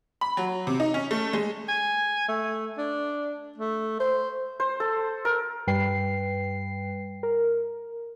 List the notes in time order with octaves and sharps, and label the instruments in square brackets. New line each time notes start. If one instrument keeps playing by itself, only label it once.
[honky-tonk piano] B5
F#3
C3
D#4
C#4
A3
G#3
[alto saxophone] G#5
A3
D4
A3
C5
[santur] C5
A4
A#4
[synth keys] G2 G3 B4 G5 C7
A#4